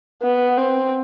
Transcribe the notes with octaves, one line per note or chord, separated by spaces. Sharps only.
B3
C4